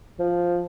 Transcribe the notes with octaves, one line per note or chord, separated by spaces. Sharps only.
F3